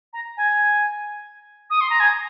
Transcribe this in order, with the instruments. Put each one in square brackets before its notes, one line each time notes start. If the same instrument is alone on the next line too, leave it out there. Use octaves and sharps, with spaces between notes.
[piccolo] A#5
G#5
D#6
C6
A#5
G#5